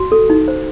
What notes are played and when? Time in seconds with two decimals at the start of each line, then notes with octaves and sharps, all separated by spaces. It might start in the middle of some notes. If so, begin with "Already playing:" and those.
Already playing: F#4
0.12 A4
0.30 D#4
0.48 C5